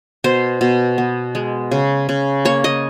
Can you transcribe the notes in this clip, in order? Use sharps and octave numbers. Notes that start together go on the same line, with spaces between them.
B2 C5
B2
B3
G#3
C#3
C#3
A#3 C#5
D#5